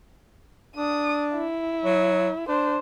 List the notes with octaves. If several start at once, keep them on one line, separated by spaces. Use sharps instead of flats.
D4 D#6
E4
F#3
D4 C5